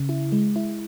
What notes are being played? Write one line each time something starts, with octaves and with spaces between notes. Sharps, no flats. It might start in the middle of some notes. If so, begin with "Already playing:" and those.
Already playing: C#3
E4
G#3
E4